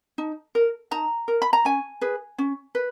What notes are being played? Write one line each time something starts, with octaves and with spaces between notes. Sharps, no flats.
D#4
A#4
D#4 A#5
A#4
B5
A#5
C#4 G#5
G#4 B4
C#4
B4